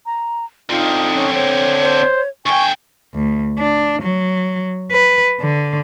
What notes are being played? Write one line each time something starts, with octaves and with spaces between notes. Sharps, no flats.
A#5
D3 C4 D#4 F4
C#4
C5 C#5
C5
D2 G5 G#5 C#6
D2
D4
F#3
B4
D3